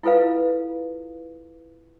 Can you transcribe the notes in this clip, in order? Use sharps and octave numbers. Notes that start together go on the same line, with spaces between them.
E4 F4 A4 B4 F5